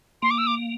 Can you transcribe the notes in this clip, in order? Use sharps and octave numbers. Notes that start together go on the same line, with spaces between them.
A#3 C6
D6
E6
D6